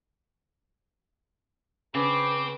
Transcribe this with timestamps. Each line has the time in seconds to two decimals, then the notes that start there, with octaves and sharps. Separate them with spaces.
1.95 C#3 C4 B4 D6